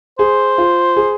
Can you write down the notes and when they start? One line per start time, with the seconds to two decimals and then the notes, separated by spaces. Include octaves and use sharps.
0.19 G#4 C5
0.58 F4
0.97 G#4